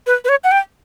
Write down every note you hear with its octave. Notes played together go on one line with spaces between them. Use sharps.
B4
B4
C#5
F#5
G5